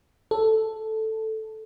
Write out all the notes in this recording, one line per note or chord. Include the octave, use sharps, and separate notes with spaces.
A4